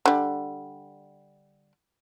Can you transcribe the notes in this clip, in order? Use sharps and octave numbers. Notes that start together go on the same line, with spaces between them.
D3 G3